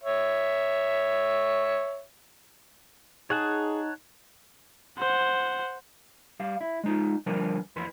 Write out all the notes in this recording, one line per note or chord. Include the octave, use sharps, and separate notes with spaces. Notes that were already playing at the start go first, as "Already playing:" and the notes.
C#5 E5
D#4 G#4 C#5 F#5 A5
C5 F#5
G3 F5
E4
G#3 D#4 F4
D3 F3 G3 A#4 B4
F2 E3 B4 C6